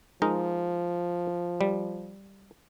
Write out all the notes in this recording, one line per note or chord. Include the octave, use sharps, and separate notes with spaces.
F3 G#3 D#4 A#4
G3